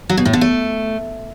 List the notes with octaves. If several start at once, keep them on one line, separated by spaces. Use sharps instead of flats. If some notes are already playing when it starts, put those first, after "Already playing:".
F#3
B2
A2
D3
A3